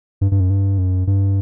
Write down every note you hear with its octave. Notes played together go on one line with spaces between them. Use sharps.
G2
G2
F#2
G2
F#2
G2